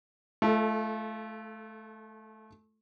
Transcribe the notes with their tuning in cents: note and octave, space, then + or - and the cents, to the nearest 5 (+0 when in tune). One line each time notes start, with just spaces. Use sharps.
A3 -25 F4 -25 A4 +5